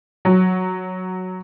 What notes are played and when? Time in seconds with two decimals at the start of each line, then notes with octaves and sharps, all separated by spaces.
0.25 F#3